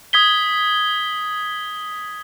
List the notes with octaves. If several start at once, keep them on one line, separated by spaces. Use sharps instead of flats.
D#6 G#6 B6 G7